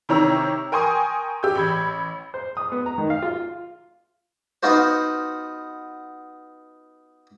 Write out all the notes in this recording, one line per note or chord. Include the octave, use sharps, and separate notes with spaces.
C3 D#3 C#5 A#5 E6
A#4 G5 G#5 C6 C#6 D#6
G4 E6 G6
A1 B5 G#6
C5
D#6
B3
A#5
D#3
F5
F4
B3 D#4 F4 F#4 C5